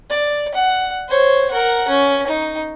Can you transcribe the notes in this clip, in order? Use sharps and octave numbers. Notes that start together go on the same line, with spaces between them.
D5
F#5
C5 C#5
A#4 F#5
C#4
D#4